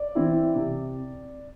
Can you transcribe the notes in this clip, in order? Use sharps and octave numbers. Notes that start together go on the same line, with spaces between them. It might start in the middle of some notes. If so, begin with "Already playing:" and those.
Already playing: D5
E3 C4 E4
C3